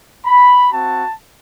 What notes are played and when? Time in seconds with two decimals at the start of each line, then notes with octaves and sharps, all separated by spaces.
0.26 B5
0.72 C4 F#4 A5